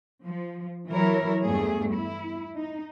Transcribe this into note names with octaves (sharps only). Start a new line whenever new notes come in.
F3
E3 F#3 E4 A#4 C#5
E2 G2 A3 G#4
E4
D#4